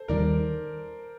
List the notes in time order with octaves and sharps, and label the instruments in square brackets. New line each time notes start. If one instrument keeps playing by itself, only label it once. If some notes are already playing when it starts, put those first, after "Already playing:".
Already playing: [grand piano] A4 C5
[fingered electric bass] D#2 D#3 G3 [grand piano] A#4 D5